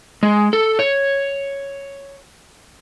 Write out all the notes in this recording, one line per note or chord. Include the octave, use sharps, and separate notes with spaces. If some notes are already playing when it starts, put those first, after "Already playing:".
G#3
A4
C#5